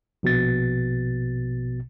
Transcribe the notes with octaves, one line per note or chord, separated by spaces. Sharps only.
A#1 B2 A6